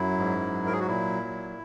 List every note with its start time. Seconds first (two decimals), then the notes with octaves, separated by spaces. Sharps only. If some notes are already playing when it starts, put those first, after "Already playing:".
Already playing: F#2 F#3 E4
0.18 G#2
0.52 F#3
0.66 A#4
0.73 G#4
0.80 F#4
0.88 A#2 E4
1.23 F#3